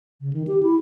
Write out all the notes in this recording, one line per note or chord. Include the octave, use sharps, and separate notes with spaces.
C#3
D#3
G4
E4